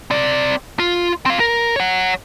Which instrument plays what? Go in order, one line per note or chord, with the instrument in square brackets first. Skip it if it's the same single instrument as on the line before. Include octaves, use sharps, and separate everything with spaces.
[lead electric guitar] C4 D5
F4
C4 F5
A#4
C#5 F#5